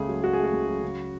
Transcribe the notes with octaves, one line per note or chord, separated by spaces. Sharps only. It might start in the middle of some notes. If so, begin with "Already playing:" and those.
Already playing: C#2 C#3 A3 G#4
F#3
C#3 F#4
A3 G#4
F#4
C#2
F#3
C#3